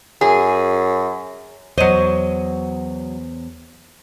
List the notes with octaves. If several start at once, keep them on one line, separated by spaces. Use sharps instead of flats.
F#2 G#4
E2 F#3 C5 C#5 D#5